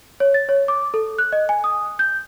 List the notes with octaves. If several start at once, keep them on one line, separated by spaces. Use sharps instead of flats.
C#5
A6
C#5
D6
A4
F#6
D#5
G#5
D#6
G6